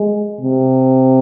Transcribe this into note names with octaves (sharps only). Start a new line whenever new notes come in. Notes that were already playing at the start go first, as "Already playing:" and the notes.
Already playing: G#3
C3